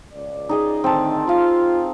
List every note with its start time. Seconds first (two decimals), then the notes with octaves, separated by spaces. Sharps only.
0.13 C#2 D5
0.49 D#4 G#4 D#5
0.84 A2 D3 D#3 C4 A5
1.27 F4 F5 C6